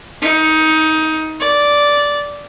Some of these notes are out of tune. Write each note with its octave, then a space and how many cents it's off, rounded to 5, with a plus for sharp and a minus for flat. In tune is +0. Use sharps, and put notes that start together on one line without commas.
D#4 +20
D5 -10